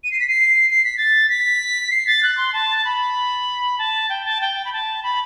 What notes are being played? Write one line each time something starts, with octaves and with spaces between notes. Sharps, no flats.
D#7
C7
B6
C7
C7
B6
A6
B6
C7
A6
F#6
C6
A5
B5
A5
G5
A5
G5
B5
A5
B5